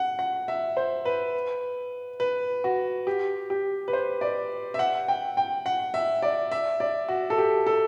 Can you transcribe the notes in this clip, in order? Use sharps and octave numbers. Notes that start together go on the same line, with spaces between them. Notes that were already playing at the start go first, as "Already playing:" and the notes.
Already playing: F#5
F#5
E5
C5
B4
B4
F#4
G4
G4
B4
C5
D5
E5
F#5
G5
G5
F#5
E5
D5
E5
D5
F#4
A4
G4
A4